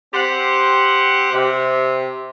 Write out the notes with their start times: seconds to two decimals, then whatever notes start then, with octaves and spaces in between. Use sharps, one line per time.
0.13 C4 G4 C5 F#5
1.33 C3